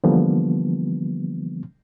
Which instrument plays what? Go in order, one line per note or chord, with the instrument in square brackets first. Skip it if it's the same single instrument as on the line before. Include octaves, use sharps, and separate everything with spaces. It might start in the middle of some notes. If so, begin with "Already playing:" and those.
[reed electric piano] D3 E3 F3 G3 A#3 B3